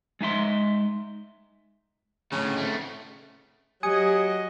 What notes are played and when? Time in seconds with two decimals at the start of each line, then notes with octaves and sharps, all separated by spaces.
0.21 G#3 D#4 E5 C6
2.32 D2 A2 C#3
2.57 A3 C4
3.83 F#3 G4 D#5 G#5 D#6 C#7